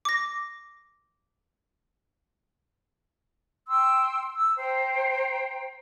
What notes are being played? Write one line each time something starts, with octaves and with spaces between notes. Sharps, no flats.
D6 A#6
G5 C6 E6
E6
C5 G5 A#5